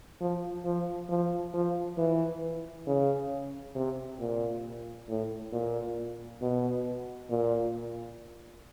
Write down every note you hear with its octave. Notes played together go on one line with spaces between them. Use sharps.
F3
F3
F3
F3
E3
C#3
C3
A#2
A2
A#2
B2
A#2